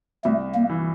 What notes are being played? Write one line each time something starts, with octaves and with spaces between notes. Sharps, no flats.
C2 A3
A#3
E3